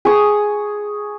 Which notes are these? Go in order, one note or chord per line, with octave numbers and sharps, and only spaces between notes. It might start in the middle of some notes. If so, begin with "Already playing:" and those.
G#4 C#6 D#6